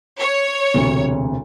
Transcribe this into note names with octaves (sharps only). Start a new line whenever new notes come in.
C#5
E1 D2 C3